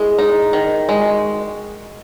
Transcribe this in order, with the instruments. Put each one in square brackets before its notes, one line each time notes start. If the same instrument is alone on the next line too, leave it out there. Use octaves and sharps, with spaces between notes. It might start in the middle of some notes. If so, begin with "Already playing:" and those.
Already playing: [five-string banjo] G#3 [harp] E4 F#4 G#4
[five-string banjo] D#4
D#3
G#3
[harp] F#4